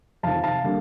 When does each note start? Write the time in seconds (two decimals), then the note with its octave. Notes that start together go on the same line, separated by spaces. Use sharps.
0.23 F2 C3 D#3 F5 A5
0.43 F5 A5
0.64 D3 G3 A#3